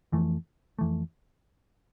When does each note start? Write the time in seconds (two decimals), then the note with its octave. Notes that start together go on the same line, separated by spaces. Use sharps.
0.12 F2 E3 A3
0.79 F2 E3 A3